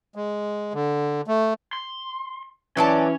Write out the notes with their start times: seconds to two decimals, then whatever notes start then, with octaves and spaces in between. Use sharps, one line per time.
0.16 G#3
0.74 D3
1.27 A3
1.73 C6
2.77 E3 F#3 C#4 D5 A5